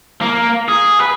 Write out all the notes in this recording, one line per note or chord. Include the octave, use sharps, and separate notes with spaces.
A#3
G#4
B4